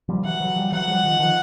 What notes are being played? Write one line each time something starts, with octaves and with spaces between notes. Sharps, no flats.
F3 G3
E3 F#3 F#5
E3 F#3
F3 G3
E3 F#3 F#5
F3 G3
D#3 F3
D#3 F3